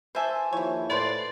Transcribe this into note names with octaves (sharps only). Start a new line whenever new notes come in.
E3 C5 E5 G#5 A5
D#2 E3 F3 E4 C#5
A2 A4 B4 C5 D5